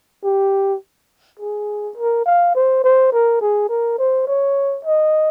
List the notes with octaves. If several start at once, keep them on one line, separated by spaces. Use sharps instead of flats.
G4
G#4
A#4
F5
C5
C5
A#4
G#4
A#4
C5
C#5
D#5